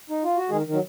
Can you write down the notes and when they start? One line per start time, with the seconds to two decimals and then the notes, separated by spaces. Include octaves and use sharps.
0.10 D#4
0.24 F4
0.37 F#4
0.50 D#3 G#3 G#4
0.66 D#3
0.73 F#3